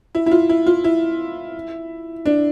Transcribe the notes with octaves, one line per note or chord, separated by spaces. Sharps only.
E4
E4
F4
E4
F4
E4
D4